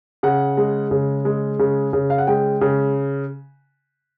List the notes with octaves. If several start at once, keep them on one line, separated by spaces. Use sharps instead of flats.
C#3 F#5
G#3
C#3
G#3
C#3
C#3
F5
F#5
G#3 G5
C#3